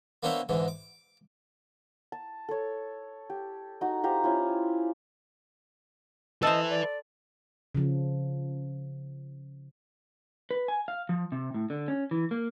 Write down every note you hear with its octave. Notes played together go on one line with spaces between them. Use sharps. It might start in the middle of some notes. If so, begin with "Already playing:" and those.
A#3 B3 D4 C5 C#5 E5
G#2 D3 E3
D6
A5
A4 C#5
G4
D#4 F#4
F4 G4 C5 A#5
C#4 E4 F4
A4 B4 C5 D#5 E5
D5
C#3 F3
B4
G#5
F5
F3
C3
A2
D3
C#4
E3
A#3